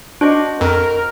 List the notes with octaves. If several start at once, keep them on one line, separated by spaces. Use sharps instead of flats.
D4 F#4 C5 D#5
F2 A#4